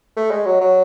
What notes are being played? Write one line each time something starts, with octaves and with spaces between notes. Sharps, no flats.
A3
G#3
F#3
F#3